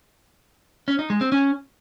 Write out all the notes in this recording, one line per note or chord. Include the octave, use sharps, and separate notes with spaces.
C#4
D#4
G#3
C4
C#4